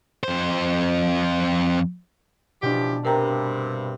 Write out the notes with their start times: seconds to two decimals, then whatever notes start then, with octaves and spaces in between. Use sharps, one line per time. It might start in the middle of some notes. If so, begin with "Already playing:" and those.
0.24 F2 C5
2.62 B2 E3 F3 D4 G4
3.05 G2 C3 A#4 G5 A#5